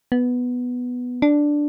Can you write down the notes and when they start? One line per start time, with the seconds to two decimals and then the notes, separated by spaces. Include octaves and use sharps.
0.12 B3
1.22 D4